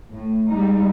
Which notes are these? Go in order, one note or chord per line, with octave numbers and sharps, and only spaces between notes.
A2
G3 G#3 D#4